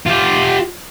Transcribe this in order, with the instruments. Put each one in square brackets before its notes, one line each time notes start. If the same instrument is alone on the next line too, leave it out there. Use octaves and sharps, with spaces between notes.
[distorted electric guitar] F4 G4